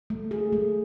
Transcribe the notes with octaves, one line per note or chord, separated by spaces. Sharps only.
A3
G#4
A3